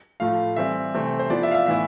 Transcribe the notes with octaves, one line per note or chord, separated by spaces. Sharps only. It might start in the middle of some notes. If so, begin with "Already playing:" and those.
A2 F3 A3 F5
E3 G3 C4 E5
C3 E3 A3 C4
C5
F3 B3 E4 D5
E5
F5
E5
A2 E3 B3 E4 E5